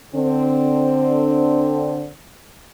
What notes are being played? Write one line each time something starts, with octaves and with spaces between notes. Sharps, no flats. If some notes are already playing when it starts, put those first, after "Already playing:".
D3 C4